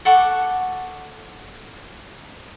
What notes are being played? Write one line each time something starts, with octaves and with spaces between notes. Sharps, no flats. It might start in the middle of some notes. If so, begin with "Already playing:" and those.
A4 F#5 C#6 D6